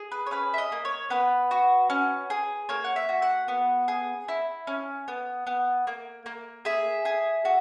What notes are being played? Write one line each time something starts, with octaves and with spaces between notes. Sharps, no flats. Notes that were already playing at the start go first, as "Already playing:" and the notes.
Already playing: G#4
B4
C#5
C#4 B4
E5
D#5
A#3
C#5
B3 B4
F#4
C#4
G#4
A#3 C#5
F#5
E5
F#4
F#5
B3
G#4
E4
C#4
B3
B3
A#3
A#3
G#4 E5
G#4
F#4